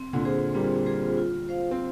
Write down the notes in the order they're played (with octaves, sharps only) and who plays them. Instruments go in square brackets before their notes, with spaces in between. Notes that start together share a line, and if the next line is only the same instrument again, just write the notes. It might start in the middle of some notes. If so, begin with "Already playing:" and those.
Already playing: [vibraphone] C4
[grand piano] A#2 D3
[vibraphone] F4 G#4 C5
[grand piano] G3 A#3 [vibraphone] C4
[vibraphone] F4 G#4 C5
F4
C5 F5
[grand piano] C4